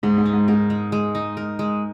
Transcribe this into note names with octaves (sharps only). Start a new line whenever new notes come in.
G#2 G#3
G#2
D#4
G#2
G#2 A#4
G#3
G#3
D#4
A#4
G#3